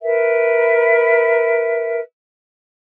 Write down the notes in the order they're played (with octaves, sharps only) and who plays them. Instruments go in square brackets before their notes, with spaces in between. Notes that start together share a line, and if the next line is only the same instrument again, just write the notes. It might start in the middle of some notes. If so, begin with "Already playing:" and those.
[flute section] A#4 B4 E5